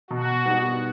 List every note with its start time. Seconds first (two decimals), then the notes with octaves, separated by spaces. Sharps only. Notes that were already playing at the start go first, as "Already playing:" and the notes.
0.11 B2 F#4
0.45 G3 B3 D#4